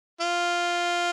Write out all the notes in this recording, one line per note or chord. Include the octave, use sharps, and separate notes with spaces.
F4